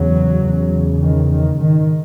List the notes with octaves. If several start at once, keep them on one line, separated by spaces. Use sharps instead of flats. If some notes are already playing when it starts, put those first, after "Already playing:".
Already playing: E2 C#3 F#3
E2 C#3
D#3
D#3
G#2 D#3